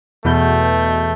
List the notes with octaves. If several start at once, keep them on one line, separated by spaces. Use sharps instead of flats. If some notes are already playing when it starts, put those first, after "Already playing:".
E2 B2 A3 G6